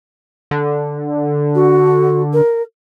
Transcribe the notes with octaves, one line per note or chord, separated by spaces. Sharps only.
D3
F#4
A#4